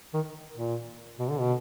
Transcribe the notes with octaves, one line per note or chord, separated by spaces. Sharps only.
D#3
A#2
B2
D3
B2